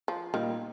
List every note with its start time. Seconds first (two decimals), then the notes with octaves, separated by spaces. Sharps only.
0.08 F3
0.33 A#2 D#3 G3 A#3 F4 A#4